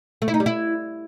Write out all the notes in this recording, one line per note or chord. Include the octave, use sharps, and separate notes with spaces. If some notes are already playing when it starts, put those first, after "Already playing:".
A3
E4
D#4
G3
E4